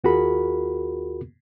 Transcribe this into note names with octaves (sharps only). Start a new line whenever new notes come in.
D#2 F4 F#4 G#4 A#4 B5